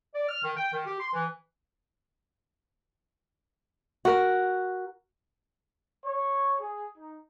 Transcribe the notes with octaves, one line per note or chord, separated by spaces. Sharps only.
D5
F6
D#3
G5
D#3
G4
C6
E3
F#4 A#4
C#5
G#4
D#4